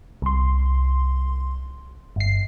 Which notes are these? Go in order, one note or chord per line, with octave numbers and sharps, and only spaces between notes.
C2 C6
G1 C7